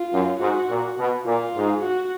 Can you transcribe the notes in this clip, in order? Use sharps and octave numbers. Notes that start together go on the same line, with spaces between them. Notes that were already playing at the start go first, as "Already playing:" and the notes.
Already playing: F4
F#2
G#2 F#4
A#2
B2
A#2 F4
G#2
F#4